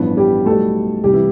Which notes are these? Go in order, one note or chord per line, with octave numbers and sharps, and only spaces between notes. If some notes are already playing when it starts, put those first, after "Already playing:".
Already playing: A1 G2 F3 B3
G3 G4
B1 B2 G3 A3 A4
C2 C3 G3 G4
E3 E4